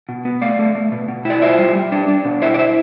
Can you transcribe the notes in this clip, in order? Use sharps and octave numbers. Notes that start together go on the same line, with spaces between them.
B2
B3
A3 D5 F5
A3
A3
B2
B2
E4 D5
F4 C5 E5
G3
G3
D4
D4
B2
E4 C5 E5
D5
E4 C5 E5